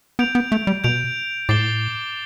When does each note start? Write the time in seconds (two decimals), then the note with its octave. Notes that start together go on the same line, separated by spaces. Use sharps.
0.19 B3 G6 D7 F7
0.35 B3
0.52 A3
0.67 G3
0.84 B2 G6 D7 F7
1.49 A2 D6 A6 C7 E7 G7